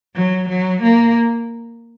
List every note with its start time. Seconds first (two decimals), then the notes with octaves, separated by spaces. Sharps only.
0.15 F#3
0.48 F#3
0.82 A#3